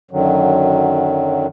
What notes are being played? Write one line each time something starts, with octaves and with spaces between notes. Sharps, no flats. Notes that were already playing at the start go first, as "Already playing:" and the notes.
F#2 D3 D#3 F#3